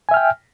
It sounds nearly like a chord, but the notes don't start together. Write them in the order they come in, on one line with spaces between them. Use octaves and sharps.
G#5 E5 F6 G5